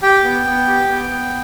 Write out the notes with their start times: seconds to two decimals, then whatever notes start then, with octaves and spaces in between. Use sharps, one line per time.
0.02 G4 G5
0.24 B3
0.46 B3
0.67 G4
0.89 B3
1.11 B3